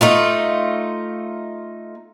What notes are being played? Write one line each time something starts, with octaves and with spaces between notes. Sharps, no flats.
A3 D#4 F4